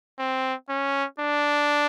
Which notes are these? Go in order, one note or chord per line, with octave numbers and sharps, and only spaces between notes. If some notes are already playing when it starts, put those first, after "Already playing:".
C4
C#4
D4